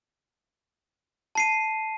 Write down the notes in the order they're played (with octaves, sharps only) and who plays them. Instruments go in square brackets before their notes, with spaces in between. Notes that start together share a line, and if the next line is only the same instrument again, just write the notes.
[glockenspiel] A5 C7 D#7